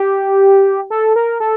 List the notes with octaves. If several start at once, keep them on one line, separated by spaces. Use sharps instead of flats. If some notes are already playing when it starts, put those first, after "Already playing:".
Already playing: G4
A4
A#4
A4